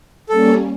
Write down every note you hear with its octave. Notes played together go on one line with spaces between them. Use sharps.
G3 A#3 C#4 A4